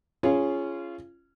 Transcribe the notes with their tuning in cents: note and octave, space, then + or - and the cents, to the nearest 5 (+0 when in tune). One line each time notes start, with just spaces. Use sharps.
C#4 +0 F4 -25 G#4 +0